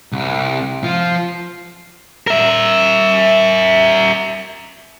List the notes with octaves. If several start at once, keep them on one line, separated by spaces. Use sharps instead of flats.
C2
F3 F4
A#4 E5